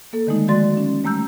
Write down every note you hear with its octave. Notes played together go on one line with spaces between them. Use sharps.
A#3 A4
D3 D#3 G#3 A3 D#4
F3 G#3 F#4 D5 C6 A6
C#4
G3 A3 A#5 E6 G6